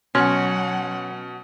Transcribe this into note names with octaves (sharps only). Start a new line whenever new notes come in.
B2 F#3 C#4 F#5 C6 F6